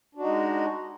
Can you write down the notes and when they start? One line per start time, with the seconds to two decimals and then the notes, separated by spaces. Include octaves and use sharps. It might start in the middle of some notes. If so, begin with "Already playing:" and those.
0.15 D4
0.18 F#4
0.21 D#4
0.24 G#3